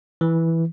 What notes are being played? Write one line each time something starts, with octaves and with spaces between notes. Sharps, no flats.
E3